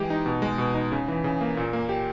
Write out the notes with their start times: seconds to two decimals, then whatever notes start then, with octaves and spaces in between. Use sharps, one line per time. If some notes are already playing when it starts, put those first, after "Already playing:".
Already playing: E3 G#3 G4
0.10 D#4
0.26 B2
0.42 G#3
0.58 B2
0.75 D#4
0.92 C#3
1.08 E3
1.24 C#3
1.41 A#3
1.57 A#2
1.73 A#3
1.89 G4